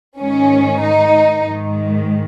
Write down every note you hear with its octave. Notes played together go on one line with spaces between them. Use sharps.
G#2 D#3 C#4
D#4
G#2 D#3